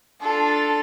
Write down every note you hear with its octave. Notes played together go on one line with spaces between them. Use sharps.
D4 F4 A4